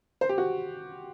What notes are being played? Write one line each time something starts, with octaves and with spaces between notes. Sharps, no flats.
C5
G4
F#4